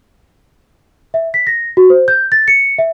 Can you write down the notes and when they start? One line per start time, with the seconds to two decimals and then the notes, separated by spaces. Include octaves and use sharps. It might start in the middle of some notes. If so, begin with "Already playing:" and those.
1.14 E5
1.34 B6
1.47 A#6
1.77 F#4
1.90 C5
2.08 G6
2.32 A6
2.48 C#7
2.78 E5